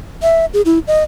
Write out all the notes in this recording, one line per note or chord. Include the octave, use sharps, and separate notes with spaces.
E5
G#4
E4
D#5